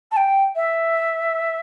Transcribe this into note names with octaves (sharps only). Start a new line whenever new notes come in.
A5
G5
E5